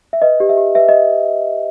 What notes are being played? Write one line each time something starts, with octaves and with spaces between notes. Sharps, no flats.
E5
B4 D#5
G4
E5
G4
B4 E5
D#5